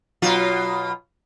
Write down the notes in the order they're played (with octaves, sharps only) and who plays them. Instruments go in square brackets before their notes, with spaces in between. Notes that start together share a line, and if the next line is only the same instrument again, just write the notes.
[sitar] B2 F#3 F4